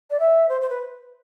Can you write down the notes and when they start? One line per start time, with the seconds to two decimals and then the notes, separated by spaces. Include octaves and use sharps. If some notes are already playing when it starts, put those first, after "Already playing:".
0.11 D5
0.20 E5
0.49 C5
0.61 C5
0.70 B4